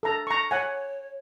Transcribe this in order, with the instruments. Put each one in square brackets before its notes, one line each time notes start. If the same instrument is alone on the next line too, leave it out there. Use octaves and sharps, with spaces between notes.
[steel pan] A4 A#5
A#5 C#6
[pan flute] C#5 [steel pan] F#5 G#5